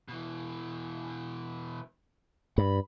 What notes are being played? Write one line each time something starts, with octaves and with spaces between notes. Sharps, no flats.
B2 E3
G2 B5